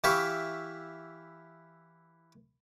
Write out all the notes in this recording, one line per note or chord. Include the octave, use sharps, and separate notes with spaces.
E3 E4 G4 E5 F5 C#6